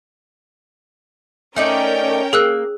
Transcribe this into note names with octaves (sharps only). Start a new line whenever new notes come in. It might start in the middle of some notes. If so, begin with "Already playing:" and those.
A3 C#4 D#4 A#4 D5 G5
A#3 G#4 E6 F#6